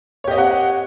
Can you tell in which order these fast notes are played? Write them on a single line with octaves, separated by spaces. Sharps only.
C#5 G4 D#5 C4 F#5